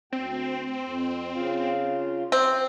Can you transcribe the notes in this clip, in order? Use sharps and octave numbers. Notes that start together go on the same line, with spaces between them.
D2 C4 G5
F2
C#3 F4
C4